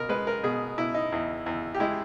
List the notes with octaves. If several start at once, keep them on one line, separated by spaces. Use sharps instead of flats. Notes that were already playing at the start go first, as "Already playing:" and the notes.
Already playing: B2 A#4
G#3 B4
A#4
B2 G#4
B2 E4
D#4
E2
E2
G4
G#3 E4